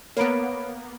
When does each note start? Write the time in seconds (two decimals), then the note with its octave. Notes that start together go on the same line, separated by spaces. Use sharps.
0.17 A#3 B3 C#5 B5 D7